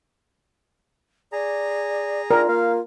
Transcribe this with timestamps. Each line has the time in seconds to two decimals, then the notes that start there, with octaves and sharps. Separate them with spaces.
1.32 G#4 D5 A#5
2.31 D4 F4 A#4
2.48 A#3 F5